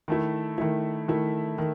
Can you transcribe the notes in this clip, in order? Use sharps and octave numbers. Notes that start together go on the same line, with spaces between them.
D#3 A3 E4
D#3 A3 E4
D#3 A3 E4
D#3